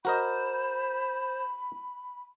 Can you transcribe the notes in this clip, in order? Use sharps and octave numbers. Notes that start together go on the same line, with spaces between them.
F#4 A#4 C5 D#5 B5